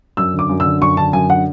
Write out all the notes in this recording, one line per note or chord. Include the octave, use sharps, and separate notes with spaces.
F#2 E6
D3
D6
F#2
E6
D3
F#2 C#6
D3 A5
F#2 G#5
D3 F#5